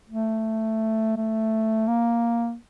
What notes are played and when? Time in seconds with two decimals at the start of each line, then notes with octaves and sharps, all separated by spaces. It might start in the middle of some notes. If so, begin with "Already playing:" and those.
0.09 A3
1.16 A3
1.87 A#3